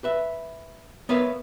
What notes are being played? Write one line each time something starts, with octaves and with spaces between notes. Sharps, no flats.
B4 E5
B3 A#4 B4 C#5 E5 F5